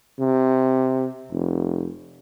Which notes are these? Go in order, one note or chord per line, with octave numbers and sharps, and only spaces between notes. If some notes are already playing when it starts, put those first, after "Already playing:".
C3
F1